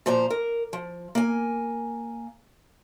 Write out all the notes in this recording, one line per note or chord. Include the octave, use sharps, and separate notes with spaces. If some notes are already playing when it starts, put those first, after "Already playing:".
A#2 F3 C5 A#5
A#4
F3
A#3 G#5